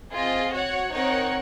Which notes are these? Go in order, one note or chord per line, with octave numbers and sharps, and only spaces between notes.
C4 F4 G#4 D#5
F#4 C#5 F#5
C4 D#4 A#4 C#5 F#5